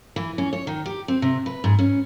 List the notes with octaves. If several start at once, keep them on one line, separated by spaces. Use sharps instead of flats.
E3
C#4
C#5
D#3
G4
C4
C3
B4
G#2
C#4